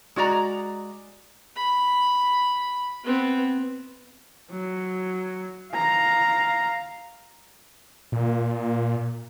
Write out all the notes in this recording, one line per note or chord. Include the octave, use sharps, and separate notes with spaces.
G#3 F#4 D5 A#5
B5
B3 C4
F#3
F5 A#5
A#2